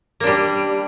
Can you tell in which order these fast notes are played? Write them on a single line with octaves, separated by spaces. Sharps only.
A#3 D4 G3